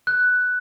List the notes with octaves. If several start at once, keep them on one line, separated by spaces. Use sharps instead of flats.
F#6